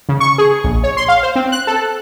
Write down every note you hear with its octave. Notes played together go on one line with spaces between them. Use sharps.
C#3
C#6
G#4
A#1
C#5
C6
F5
C5
C4
F#6
A4